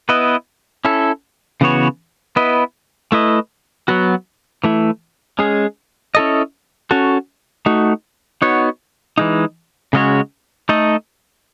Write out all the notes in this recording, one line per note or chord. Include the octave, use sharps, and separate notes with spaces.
B3 E4 B4 D#5
C#4 E4 A4
C#3 E3 B3 F#4 C#5
B3 E4 B4 D#5
A3 E4 B4 D#5
F#3 B3 F#4
E3 A3 E4
G#3 C#4 G#4
C#4 E4 A4 D#5
C#4 F#4 A4
A3 D#4 F#4
B3 D#4 F#4 C#5
E3 G#3 D#4
C#3 G#3 C#4 F#4 C#5
A3 D#4 A4 D#5